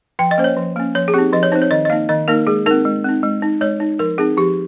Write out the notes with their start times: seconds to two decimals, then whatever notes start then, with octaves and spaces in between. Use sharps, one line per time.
0.19 F3 G5
0.31 D#5
0.38 A#3 C#4 C5
0.44 C#5
0.57 F3
0.76 A#3 C#4
0.95 F3 C#5
1.08 G#4
1.14 C4 D#4 G4
1.33 F3 D#5
1.43 C#5
1.52 C4 D#4 C5
1.62 C#5
1.71 D#3 D#5
1.85 D#5
1.90 A#3 D#4 F5
2.09 D#3 D#5
2.28 A#3 D#4 A#4
2.47 G#3 G#4
2.66 C4 D#4 A#4
2.85 G#3
3.04 C4 D#4
3.23 G#3
3.42 D#4
3.61 G#3 C#5
3.80 D#4
3.99 F3 A#4
4.18 C4 D#4 G#4
4.37 F3 G4